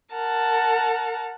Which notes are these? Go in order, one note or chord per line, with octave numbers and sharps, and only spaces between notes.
A#4 F#5 A5